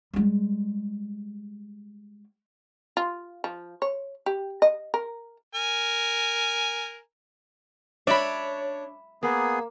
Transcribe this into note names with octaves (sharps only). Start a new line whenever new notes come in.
G3 G#3
F4
F3
C#5
G4
D#5
A#4
A#4 G#5
D4 C#5 D5 E5 B5
A#3 B3 G#4